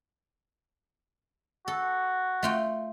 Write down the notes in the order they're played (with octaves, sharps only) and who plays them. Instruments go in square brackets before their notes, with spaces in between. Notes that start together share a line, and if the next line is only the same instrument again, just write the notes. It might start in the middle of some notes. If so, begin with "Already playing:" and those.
[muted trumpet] F#4 [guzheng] A4
[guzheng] A3 F4 G5